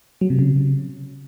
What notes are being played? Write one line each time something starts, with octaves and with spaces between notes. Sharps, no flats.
F#3
C3
C#3